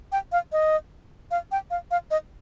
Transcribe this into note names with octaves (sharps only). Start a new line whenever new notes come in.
G5
F5
D#5
F5
G5
F5
F5
D#5